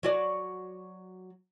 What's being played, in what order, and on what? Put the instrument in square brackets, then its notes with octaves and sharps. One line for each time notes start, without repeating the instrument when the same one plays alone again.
[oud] F#3 F#4 D5